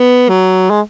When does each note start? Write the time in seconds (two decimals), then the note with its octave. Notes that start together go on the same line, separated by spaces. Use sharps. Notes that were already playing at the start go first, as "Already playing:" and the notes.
Already playing: B3
0.29 F#3
0.70 G#3